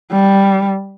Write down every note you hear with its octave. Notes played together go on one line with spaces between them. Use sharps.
G3